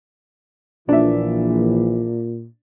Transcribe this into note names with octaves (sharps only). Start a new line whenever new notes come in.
A#1 A#2 E3 D4 E5